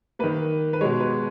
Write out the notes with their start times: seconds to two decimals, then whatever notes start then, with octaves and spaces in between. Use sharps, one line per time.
0.19 D#3 A#3 B4
0.73 B4
0.81 B2 G#3 C#5
1.00 B4